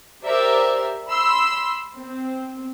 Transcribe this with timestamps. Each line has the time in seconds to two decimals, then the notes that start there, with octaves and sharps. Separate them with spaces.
0.25 G4 A#4 C5 D5 E5
1.08 B5 C6 E6
2.00 C4